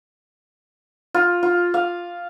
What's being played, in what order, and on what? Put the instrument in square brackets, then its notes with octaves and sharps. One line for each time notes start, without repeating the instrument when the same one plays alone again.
[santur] F4
F4
F5